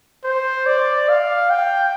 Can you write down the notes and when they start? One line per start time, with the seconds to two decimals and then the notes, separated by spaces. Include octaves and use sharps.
0.24 C5
0.66 D5
1.09 F5
1.50 G5